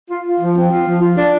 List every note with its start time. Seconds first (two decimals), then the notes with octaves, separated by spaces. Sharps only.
0.09 F4
0.25 F4
0.40 F3
0.55 C4
0.70 F4
0.86 F3
1.01 F4
1.17 D4